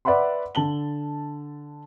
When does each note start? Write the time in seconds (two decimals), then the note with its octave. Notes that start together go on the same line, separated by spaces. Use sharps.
0.05 B4 D5 E5 F#5 B5 C6
0.55 D3 A5 F#7 G7